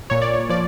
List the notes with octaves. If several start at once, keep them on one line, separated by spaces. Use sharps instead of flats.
A#2 C#5
D5
C#5
F3 D5